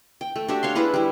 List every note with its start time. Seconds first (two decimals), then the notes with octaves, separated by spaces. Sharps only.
0.21 G5
0.36 A3
0.48 D4 F#4 G4 E5
0.63 C#5 F5 C6
0.75 D4 E4 G#4 B4
0.94 G3 E4